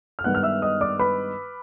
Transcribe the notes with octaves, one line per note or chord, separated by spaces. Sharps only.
F6
G2 D#3 G#3 B3 D#4 F#5 F#6
F6
E5 E6
D#5 D#6
D5 D6
B4 B5